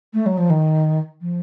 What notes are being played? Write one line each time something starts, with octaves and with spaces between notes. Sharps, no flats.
A3
F#3
F3
D#3
F3